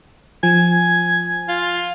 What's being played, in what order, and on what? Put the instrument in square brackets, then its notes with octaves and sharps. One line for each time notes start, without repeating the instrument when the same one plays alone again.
[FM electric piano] F3 [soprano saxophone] G#5
[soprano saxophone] F4